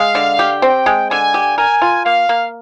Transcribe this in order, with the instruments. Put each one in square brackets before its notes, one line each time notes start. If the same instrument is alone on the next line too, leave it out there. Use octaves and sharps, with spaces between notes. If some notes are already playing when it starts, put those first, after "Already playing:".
Already playing: [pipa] G#3 [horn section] F5
[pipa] D3
G4
[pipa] C4 [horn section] G5
[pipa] G#3
[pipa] D3 [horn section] G#5
[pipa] G4
[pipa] A#4 [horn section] G#5
[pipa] F4
[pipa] A#3 [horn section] F5
[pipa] A#3